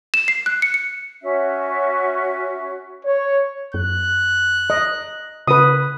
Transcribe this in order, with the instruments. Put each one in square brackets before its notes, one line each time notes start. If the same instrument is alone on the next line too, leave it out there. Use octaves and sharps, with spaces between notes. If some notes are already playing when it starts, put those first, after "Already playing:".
[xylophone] E7
C7
F#6
C#7
C#7
[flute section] C#4 F#4 E5
[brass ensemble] C#5
[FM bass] F#2 [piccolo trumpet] F#6
[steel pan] D#5
[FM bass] C#3 [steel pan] B4 D#6